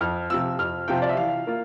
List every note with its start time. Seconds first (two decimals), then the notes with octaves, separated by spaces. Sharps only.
0.01 F2 F6
0.30 C3 F3 C4 F4 E6
0.59 F2 F6
0.88 C3 F3 C4 F4 G5
1.02 D5
1.09 E5
1.17 E3 F5
1.47 A#3 F4